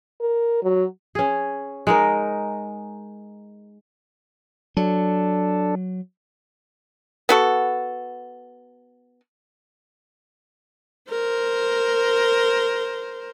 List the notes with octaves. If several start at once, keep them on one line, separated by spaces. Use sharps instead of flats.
A#4
F#3
C#4 G#4
G#3 D#4 A#4
F#3 D4 A4
B3 F#4 A4
A#4 C5